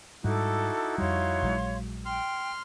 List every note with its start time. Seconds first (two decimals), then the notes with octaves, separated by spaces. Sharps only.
0.24 G#2 G3 D#4 E4 F#4 A4 D6
0.98 F2 G3 C#5 F5 C6
1.42 A#1 F#3 G#3
2.06 G5 C6 F6